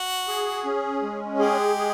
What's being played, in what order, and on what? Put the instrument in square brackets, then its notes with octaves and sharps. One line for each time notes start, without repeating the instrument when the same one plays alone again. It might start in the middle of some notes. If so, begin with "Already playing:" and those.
Already playing: [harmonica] F#4
[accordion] G#4
C#4
G#3
[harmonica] G4 [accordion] G#4
[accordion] G#4